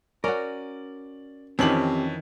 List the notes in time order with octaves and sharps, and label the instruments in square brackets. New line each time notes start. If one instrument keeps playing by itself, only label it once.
[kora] C#4 F#4 [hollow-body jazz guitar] A#4 [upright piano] D5
[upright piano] F2 C#4 F#7 [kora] D#3 E3 [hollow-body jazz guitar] C4 G4